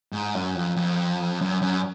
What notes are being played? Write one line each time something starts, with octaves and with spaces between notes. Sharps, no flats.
G#2
F#2
F2
F2
F#2
F#2